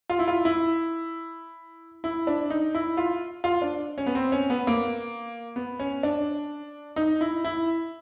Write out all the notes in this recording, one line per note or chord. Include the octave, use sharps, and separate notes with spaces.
F4
E4
F4
E4
E4
D4
D#4
E4
F4
F4
D4
C#4
B3
C4
C#4
B3
A#3
B3
C#4
D4
D#4
E4
E4